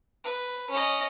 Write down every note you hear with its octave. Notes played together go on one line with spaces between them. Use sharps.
B4
C#4 D#5